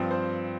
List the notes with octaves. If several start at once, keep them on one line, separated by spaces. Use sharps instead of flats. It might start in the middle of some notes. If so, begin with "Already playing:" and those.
Already playing: G2 F3 C4
C5